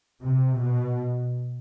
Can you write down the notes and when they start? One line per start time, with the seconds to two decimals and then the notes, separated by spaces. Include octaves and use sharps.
0.24 C3
0.60 B2